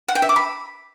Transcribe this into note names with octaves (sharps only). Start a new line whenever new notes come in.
F#5
G5
E5
D6
B5